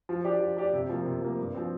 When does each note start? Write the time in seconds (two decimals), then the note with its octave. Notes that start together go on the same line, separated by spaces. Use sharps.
0.09 F3
0.24 D4 G4 D5
0.40 F3
0.57 D4 G4 D5
0.74 C3
0.89 F3 A#3
1.06 C3
1.22 F3 A#3
1.39 G2
1.55 F3 C4